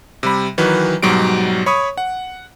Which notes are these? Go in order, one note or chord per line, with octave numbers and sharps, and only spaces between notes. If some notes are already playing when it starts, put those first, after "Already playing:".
C3 G3 B5
D#3 E3 F#3 B4
G#2 B2 F#3 G3 D7
C#5 B5 C#6 D#6
F#5